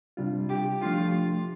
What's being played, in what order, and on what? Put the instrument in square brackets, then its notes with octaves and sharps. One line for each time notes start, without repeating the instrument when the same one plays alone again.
[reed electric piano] C3 G3 D4 F4
[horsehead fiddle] G4
[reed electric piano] F3 A3 D4 G4 [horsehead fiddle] F4